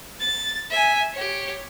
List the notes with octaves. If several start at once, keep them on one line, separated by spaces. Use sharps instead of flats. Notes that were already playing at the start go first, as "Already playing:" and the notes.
A6
E5 G#5
G4 C#5